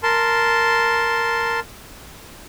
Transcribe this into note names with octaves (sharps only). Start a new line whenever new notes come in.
A#4 A5 C6